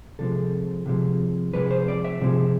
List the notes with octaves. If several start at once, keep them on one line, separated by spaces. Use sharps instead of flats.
C3 F3 G#3 A4
C3 F3 G#3
C3 F3 G#3 B4
C5
D5
E5
C3 F3 G#3